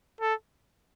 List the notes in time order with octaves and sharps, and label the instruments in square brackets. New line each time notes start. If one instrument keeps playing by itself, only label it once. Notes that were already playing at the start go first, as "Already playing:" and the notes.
[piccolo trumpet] A4